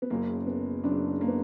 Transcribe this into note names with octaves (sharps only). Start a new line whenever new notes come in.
B3
F#1 F#2 C#3 A#3
B3
F#1 F#2 C#3 D4
A#3
B3